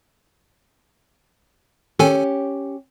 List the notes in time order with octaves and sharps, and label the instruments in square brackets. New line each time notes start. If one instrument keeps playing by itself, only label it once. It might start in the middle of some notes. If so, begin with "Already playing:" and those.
[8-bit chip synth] D#3 A4 G#5 [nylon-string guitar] C#4 G4